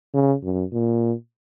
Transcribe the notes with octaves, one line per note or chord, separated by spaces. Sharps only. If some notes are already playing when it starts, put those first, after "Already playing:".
C#3
F#2
A#2